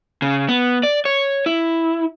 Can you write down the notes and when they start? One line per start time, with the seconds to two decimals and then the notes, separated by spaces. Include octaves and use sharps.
0.22 C#3
0.49 B3
0.83 D5
1.05 C#5
1.46 E4